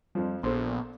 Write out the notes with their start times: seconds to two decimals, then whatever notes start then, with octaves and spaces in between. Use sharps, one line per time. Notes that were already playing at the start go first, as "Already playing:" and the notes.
0.15 F2 F3 G3
0.43 A#1 B3 A4 C5 C6